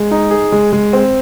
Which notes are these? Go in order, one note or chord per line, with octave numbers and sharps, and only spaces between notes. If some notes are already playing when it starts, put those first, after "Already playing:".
Already playing: G#3
D#4
G#4
G#3
G#3
C4